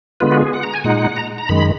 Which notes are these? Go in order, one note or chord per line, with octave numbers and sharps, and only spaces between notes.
D3 G#3 B3 F4 B4
F#4
G#4
F#5
A#5
G#5
A#2 G#3 D#4 F#5
A#5
A#5
F#2 D#3 G#3 B5